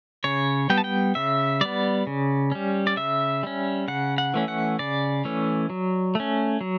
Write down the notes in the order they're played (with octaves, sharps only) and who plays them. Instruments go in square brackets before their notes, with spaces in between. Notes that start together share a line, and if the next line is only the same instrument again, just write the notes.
[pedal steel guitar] C#3 C#5
G3 B3 G5
A5
G5
C#3 E5
G3 B3 D5
C#3
G3 C#4
D5
C#3 E5
G3 C#4
C#3 F#5
F#5
E3 A3 C#4
F#5
C#3 D5
E3 A3 C#4
F#3
A3 C#4
F#3